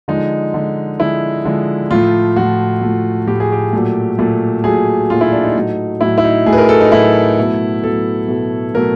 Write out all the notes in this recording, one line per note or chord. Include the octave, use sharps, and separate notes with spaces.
D3 F3 G#3 D#4
D3 F3 G#3
D3 F3 G#3 E4
D3 F3 G#3
A2 F3 A3 F4
A2 F3 A3 F#4
A2 F3 A3
A2 F3 A3 G4
G#4
G4
A#2 F#3 A3
A#2 F#3 A3
A#2 F#3 A3 G#4
A#2 F#3 A3 F4
E4
D4
D#4
A2 F#3 A3
A2 F#3 A3 E4
E4
D#4
A2 F#3 A3 G#4
B4
A#4
A4
D#4
A2 F#3 A3 E4
B2 F#3 A3
B2 F#3 A3 A4
B2 F#3 A3
B2 F#3 A3 A#4